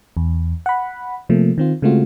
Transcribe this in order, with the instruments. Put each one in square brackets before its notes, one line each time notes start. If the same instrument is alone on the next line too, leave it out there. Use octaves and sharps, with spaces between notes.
[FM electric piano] E2
F#5 B5
C3 F3 A3 A#3
D#3 C4 F4
C#3 G#3 A3 C4 F4 F#4